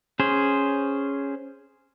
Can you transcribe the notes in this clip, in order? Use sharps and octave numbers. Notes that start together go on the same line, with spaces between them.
C#4 G#4 C5